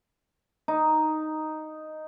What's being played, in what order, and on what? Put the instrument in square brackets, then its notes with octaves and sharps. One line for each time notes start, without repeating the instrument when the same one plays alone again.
[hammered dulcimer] D#4